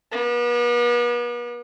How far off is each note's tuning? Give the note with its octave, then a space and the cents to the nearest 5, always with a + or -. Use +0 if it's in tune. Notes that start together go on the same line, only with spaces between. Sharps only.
B3 -40